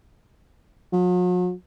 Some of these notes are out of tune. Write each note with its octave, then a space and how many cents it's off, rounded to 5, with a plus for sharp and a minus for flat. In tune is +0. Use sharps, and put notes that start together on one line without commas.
F#3 -45